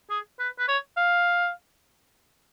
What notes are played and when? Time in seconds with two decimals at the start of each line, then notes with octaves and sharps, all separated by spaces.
0.10 G#4
0.39 B4
0.59 B4
0.68 C#5
0.97 F5